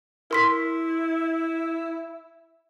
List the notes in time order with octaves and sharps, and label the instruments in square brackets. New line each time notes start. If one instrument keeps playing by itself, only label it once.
[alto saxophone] E4 [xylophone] A#4 C6 B6